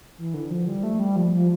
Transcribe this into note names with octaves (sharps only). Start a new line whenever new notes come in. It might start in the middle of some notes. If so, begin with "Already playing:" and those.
E3
D3
F3
G3
A3
G3
F3
F3